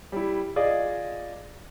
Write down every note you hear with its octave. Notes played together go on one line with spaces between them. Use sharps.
G3 E4
F4 G#4 D5 D#5